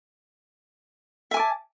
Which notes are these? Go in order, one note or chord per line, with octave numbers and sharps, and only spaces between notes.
E5 G#5 A5 D6